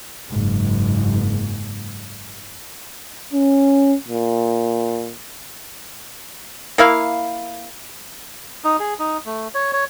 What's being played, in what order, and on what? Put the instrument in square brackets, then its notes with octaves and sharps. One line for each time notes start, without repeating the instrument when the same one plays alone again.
[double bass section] F#1 G#2
[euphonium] C#4
A#2
[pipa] A#3 E4 F5
[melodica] D#4
G#4
D#4
A3
C#5
C#5